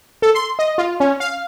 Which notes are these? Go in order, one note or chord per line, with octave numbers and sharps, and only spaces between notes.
A4
C6
D#5
F4
C#4
F5